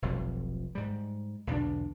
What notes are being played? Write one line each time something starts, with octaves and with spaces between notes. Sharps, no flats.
F1 B1 F2 G3
G#2 G3
B1 E2 D3 D4